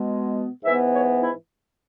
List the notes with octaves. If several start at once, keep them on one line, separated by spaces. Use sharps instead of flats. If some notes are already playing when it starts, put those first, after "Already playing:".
Already playing: B2 G#3 B3
G#2 E3 B3 E5
C#5
E4